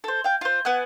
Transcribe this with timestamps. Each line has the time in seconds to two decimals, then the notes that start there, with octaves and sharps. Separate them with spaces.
0.04 A4 C5
0.24 F5 G5
0.41 F4 C5
0.65 B3 F#5 G#5 F#6